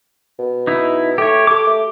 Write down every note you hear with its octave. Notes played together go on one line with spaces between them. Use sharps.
B2
D#4 E4
A3 G4 C#5
G4 A4 D6
A3